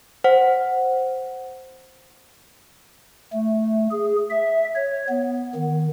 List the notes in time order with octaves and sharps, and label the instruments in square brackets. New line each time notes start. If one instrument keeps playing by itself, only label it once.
[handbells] C5 F#5
[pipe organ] A3
G#4
E5
C#5
B3
D#3